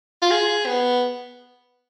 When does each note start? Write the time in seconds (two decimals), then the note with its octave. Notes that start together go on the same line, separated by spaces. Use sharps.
0.22 F4
0.31 G#4
0.66 B3